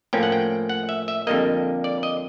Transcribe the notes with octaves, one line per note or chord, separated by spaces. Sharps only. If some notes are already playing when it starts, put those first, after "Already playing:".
A2 F3 A#3 C#4 G5
F#5
G5
F#5
E5
E5
F2 D3 G3 A#3 D#5
D5
D#5